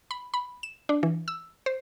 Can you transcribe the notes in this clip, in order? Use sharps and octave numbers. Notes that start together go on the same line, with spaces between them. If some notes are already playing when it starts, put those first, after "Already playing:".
B5
B5
E7
D4
E3
E6
C5